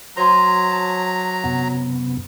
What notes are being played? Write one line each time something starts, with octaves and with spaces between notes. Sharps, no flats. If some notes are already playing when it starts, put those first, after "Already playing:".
F#3 C5 G#5 A#5 C6
A5
F#2 C3 B3